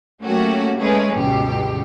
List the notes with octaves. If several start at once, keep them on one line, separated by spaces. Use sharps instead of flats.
F#3 A3 A#3 C#4 F#4 G4
G#3 A3 C#4 G#4 B4
G1 C#2 B2 G4